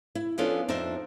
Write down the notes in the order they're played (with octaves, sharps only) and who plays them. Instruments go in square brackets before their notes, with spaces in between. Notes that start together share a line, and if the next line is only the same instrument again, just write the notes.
[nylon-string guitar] E4
F3 B3 C#4 D4 F4 A4
F2 D4 D#4 C5 E5